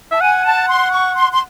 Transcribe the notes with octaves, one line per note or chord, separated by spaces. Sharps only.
E5 A5
F#5 G#5
A5
C6
C#6
C6
C6